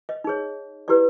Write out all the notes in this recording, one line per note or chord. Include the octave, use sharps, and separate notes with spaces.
D#5
D#4 G#4 C#5
E4 G4 B4 D5